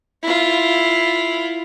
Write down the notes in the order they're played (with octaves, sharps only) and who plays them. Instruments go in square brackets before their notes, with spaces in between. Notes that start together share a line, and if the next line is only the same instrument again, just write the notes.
[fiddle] E4 F4